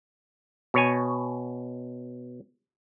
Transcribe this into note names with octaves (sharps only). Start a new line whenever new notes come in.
B2 C#5 G#5